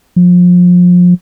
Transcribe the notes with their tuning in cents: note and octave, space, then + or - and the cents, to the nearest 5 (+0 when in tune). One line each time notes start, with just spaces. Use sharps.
F3 +30